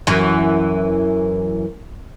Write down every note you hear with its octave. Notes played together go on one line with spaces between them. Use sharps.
F#2 E3